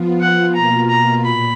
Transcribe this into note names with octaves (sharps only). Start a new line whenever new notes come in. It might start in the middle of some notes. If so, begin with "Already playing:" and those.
Already playing: F3 B3 F4
F#5
B2 A#3 F4 A#5
A#5
A#2 B5